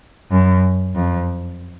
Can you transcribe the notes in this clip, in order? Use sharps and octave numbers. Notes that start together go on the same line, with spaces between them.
F#2
F2